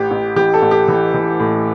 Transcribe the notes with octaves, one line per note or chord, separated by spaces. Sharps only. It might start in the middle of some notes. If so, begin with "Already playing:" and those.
Already playing: A1 G4
A1
E3 G4
A4
A1
G4
E3
E3
A2